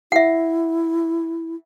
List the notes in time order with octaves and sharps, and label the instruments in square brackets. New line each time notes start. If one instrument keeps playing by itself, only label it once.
[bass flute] E4 [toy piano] E5 F#5